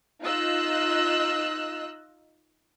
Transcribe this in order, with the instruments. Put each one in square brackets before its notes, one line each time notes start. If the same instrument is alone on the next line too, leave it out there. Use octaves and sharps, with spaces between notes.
[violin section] D#4 F4 D#5 E6 F#6